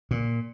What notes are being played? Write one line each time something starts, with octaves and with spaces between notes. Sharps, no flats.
A#2